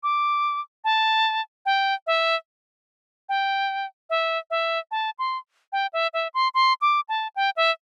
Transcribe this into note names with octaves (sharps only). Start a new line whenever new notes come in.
D6
A5
G5
E5
G5
E5
E5
A5
C6
G5
E5
E5
C6
C6
D6
A5
G5
E5